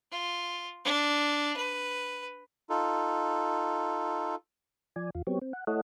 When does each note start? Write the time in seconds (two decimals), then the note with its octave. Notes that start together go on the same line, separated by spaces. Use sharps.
0.11 F4
0.85 D4
1.56 B4
2.70 D#4 F4 A4
4.96 F3 D5 G#5
5.15 E2 F4
5.27 F#3 B3 C4 G4 C#5
5.42 C4
5.53 F#5
5.67 A3 E4 A4 C#5 D#5 F#5